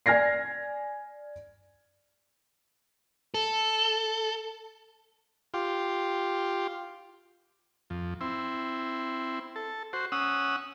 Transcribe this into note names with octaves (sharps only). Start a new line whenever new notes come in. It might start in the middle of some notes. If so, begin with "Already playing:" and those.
D5 G#5 F6 G#6 A#6 C7
A4
F4 G4
F2
C4 E4
A4
F#4 C5
C#4 F#5 D#6 E6